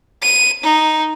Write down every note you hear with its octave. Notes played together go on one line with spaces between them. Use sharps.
D#7
D#4